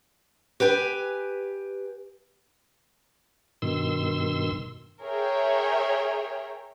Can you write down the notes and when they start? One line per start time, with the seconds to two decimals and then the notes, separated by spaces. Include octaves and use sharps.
0.60 G4 B4 G5 G#5
3.62 G2 B2 D#3 C6 E6
5.03 G#4 A#4 C#5 E5 G5